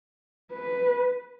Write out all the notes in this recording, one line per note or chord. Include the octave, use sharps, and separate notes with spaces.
B4